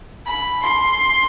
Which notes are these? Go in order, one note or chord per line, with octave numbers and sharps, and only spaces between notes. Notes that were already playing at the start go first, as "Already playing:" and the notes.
B5
C6